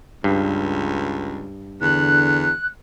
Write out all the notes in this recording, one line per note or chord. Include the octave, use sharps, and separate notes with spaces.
C#2 G2
E2 D3 F#6